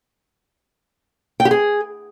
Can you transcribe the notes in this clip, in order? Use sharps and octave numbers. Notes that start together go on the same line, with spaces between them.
G5
G4
G#4